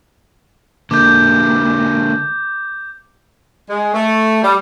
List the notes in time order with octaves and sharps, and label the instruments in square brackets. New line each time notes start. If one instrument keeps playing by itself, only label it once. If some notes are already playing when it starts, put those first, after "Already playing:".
[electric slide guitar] D3 A#3 [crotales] D6 G6
[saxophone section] G#3
A3
G3